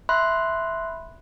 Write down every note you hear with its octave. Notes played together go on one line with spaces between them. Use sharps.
E5 B5 C6 F#6